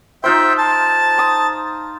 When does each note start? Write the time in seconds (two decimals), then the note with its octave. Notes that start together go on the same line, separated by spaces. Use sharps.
0.24 D#4 F4 C5 E5 G5
0.58 A5
1.18 A#5 D#6